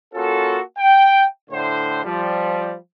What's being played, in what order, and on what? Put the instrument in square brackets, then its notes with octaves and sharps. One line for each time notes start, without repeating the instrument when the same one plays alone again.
[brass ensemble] A#3 C#4 F4 F#4 A4
G5
A2 D3 C5
F3 G3